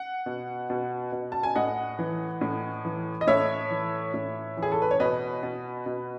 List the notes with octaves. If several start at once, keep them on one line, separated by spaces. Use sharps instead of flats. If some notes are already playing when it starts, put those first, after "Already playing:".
Already playing: F#5
B2
B2
B2
A5
G#5
A2 D#5 F#5
E3
A2
E3
D#5
A2 C#5 E5
E3
A2
E3
G#4
A4
B4
C#5
B2 B4 D#5
B2
B2